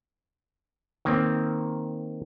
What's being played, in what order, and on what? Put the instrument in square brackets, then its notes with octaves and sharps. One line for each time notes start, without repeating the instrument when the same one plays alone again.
[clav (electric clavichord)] D#3 A#3 C4